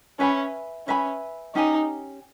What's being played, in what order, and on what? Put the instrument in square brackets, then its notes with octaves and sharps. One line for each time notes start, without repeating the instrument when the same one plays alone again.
[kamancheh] C#4 [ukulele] B4 E5 G#5 B5
[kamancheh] C#4 [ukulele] B4 E5 G#5 B5
[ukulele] C#4 G4 C#5 G#5 [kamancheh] D#4